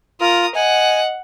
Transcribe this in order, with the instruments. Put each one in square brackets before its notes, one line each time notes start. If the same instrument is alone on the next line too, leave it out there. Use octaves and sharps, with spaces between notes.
[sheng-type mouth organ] F4 [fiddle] A#4 D#6
[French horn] D#5 [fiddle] F#5 [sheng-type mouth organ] G#5